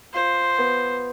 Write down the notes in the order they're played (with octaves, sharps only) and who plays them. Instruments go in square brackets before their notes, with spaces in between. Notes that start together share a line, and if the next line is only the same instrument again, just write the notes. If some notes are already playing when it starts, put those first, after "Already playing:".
[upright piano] F4 [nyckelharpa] C5
[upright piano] B3